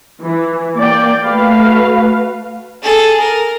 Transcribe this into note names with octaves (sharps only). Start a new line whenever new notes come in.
E3
A#3 D5 G5
A3 F#4 B4 F5
G#4 A4
A#4